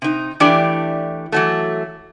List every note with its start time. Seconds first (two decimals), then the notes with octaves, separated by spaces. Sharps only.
0.02 C3 D#4
0.40 E3 A3 D4 G4 D5
1.32 E3 F#3 A3